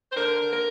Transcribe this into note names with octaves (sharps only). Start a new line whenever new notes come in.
C5
D3 A#4
D3
A#4